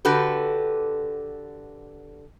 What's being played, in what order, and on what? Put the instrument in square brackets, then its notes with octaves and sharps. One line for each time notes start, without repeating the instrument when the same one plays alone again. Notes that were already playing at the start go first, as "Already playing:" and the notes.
[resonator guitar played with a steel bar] D3 F#4 G4 A4 B4